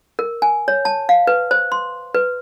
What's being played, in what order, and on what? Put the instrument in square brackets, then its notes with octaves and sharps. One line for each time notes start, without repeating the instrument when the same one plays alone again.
[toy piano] A#4
G#5
C#5
A5
F5
B4
C5
C6
B4